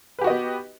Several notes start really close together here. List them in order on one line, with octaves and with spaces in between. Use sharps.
B4 G4 F#4 D#5 B3